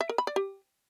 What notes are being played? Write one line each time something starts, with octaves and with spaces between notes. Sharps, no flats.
E5
A#4
B5
D5
G4